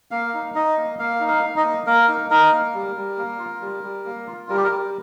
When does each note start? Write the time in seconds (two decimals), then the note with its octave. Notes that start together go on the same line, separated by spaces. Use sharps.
0.11 A#3 F5
0.34 D#4
0.55 D#4 D#5
0.78 A#3
0.99 A#3 F5
1.20 D#4
1.28 F5
1.43 D#4
1.57 D#5
1.64 A#3
1.86 A#3 A#4
2.08 D#4
2.30 D#4 A#4
2.52 A#3
2.74 G3
2.96 G3
3.18 A#3
3.39 F4
3.61 G3
3.84 G3
4.06 A#3
4.27 F4
4.49 G3 A#4
4.57 G4
4.64 A#4
4.71 G3